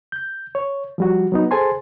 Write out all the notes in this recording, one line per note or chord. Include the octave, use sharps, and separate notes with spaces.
G6
C#5
F3 G3 F#4
F#3 B3 D#4
G#4 A4 C5 G#5 A5 C6